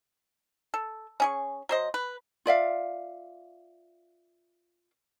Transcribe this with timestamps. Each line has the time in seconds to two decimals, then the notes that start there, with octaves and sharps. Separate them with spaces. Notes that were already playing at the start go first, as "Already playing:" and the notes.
0.74 A4
1.20 C#4 G#4 C#6
1.69 F#3 C5 D#5
1.94 B4
2.46 F4 D5 E5 F5